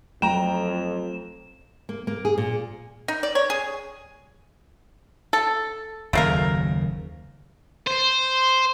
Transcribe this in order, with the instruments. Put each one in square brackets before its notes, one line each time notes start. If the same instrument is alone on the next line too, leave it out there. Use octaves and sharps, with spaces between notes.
[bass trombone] F2 [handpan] F#3 A3 [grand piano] G5 A#5 [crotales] E7
[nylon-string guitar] A#3
A#3
G#4
A#2
[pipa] D#4
D5
C#5
G#4
A4
[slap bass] F#1 D#2 C#3 [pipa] A3 A#3 A#4
[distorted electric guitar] C5